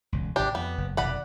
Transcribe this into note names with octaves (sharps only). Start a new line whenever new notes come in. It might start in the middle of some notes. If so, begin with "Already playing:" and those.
E1 C#2
G#1 C3 D4 G4
F2 B3
F#1
F1 B2 D#3 D5 F#5 B5